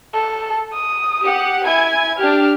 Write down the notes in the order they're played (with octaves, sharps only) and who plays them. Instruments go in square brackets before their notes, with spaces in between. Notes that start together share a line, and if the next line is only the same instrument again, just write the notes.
[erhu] A4
D#6
[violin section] G4 F#5
[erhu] E4 [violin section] G#5 G#6
[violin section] D4 G4 [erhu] F6